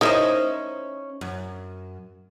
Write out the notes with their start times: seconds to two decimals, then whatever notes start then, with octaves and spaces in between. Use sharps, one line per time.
0.01 C#4 D#4 E4 A#4 C5 D#5
1.21 F#2